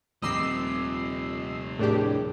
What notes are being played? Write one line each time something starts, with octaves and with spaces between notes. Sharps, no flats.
D#1 C3 F3 D#5 D6 E6 C7
A2 D4 G4 G#4 A#4